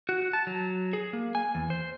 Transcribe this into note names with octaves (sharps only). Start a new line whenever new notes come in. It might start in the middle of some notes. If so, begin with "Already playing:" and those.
F#4
A5
F#3
G#4
A#3
G#5
E2
C5